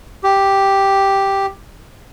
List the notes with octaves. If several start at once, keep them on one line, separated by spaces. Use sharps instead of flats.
G4